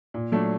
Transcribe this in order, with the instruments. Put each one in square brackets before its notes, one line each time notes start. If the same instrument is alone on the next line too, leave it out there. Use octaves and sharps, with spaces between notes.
[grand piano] A#2
F#3 A3 D4